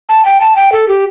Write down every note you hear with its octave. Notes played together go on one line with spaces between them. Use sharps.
A5
G5
A5
G5
A4
G4